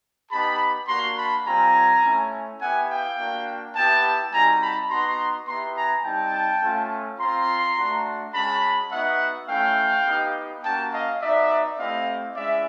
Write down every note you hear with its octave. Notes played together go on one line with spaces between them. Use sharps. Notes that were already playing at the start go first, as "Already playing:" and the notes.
B3 D#4 G4 A5 B5
A#3 D4 F#4 A#5 C6
A5 B5
G3 C4 F4 G#5 A#5
A3 C#4 E4
B3 E4 G4 F#5 G#5
F5 G5
A#3 D4 F#4
B3 E4 G4 G5 A5
G3 C4 D#4 F#4 G#5 A#5
A5 B5
B3 D#4 F#4 A#5 C6
B3 E4 G4 A#5 C6
G#5 A#5
G3 C4 D#4 G5 A5
A3 C#4 F4
C4 F4 A#5 C6
A3 D4 F#4
G#3 C#4 F#4 A5 B5
B3 D#4 F#4 E5 F#5
A3 C#4 E4 F5 G5
B3 D#4 G4
A#3 C#4 F#4 G5 A5
D#5 F5
B3 D#4 F#4 D5 E5
A3 C4 E4 G4 D#5 F5
G#3 C#4 E4 D5 E5